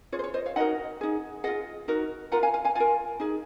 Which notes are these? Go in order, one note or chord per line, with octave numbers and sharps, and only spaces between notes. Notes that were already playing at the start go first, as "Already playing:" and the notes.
F4 G#4 C#5
C5
C#5
C5 D#5
C#5 F5
D#4 F#4 A#4 D#5 F#5
D#4 G#4
F4 G#4 D#5 F#5
D#4 F#4 A#4
F4 A#4 F#5 A#5
F5 G#5
F5 G#5
F5 G#5
F4 A#4 F5 G#5
D#4 G#4